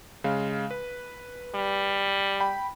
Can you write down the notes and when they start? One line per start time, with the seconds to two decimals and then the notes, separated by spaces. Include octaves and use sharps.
0.24 C#3 G#3 F5
0.71 B4
1.55 G3
2.40 G5 B5